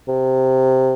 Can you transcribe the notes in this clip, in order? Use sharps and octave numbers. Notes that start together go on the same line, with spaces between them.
C3